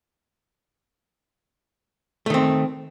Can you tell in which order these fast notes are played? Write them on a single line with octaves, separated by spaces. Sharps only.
A3 D#3 C4